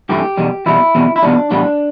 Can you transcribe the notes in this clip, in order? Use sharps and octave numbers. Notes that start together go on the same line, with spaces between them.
G2 E3 A3 G4
E2 B2 G3
E2 B2 G3 E4
E2 B2 G3
E4
E2 B2 G3 D4
A2 E3 G3 B3 D4